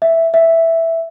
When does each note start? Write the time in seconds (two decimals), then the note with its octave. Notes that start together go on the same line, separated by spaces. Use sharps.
0.02 E5
0.34 E5